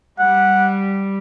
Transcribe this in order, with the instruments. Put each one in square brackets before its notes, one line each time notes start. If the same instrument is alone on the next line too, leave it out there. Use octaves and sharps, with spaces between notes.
[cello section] G3 [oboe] F#5